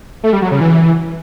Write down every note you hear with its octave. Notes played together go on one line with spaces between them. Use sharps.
A3
G3
F#3
C#3
E3